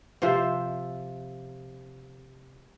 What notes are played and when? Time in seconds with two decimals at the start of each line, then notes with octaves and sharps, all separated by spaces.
0.22 C3 F3 C5 E5